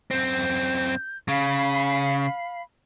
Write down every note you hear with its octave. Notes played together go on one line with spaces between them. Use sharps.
F#2 C4 G6
C#3 F5 B5